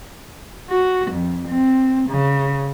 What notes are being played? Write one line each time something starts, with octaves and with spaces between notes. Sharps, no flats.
F#4
F2
C4
C#3